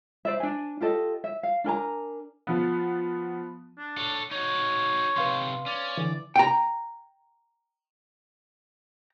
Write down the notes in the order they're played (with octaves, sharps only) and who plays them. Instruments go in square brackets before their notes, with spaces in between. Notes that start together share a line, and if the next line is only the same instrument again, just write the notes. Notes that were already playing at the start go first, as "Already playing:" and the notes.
[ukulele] C5 D5 E5
D4 G#5
F4 G4 A4 D#5
E5
F5
D4 A#4 G#5 A#5
[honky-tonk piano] F3 B3
[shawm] D4
[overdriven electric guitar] A4 C#5
[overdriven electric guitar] D#4 F#4 [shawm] C#5
[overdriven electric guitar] C3 D#4 [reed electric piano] B4 F5 C6
[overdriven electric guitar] C#4 [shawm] D5
[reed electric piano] D3 E3
[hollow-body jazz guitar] G5 A#5